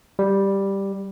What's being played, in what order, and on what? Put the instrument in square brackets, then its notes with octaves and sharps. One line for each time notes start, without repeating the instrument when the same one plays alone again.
[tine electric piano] G3